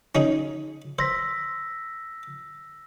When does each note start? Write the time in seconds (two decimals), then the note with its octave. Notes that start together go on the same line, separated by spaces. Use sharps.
0.15 C#4 D#4 G#4
0.99 C5 E6 A#6 B6